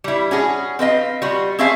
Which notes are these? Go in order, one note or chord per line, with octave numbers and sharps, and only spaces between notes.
G3 E4
C#4 F#4 G#4
C4 B4 D#5 F5
G3 F4 F#4
C4 C#4 G#4 C5 E5 F5